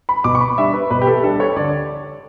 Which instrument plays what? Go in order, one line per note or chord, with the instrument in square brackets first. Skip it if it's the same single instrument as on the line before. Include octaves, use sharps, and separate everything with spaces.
[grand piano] B5
B2 D6
C#6
B5
G3 D4 E5
B4
B2 B4
G4
A4
G3 D4 A4
C#5
D3 D5